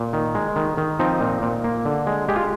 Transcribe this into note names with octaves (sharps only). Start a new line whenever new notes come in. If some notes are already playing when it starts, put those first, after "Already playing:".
Already playing: A#2
D#3
G#3
D#3
D#3
F3 C4 D#4
A#2
A#2
A#3
D3
G#3
G#3 G4
F4